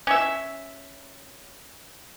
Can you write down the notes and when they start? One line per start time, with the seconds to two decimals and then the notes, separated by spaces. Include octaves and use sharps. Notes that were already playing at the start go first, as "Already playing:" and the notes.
0.07 C#4 E5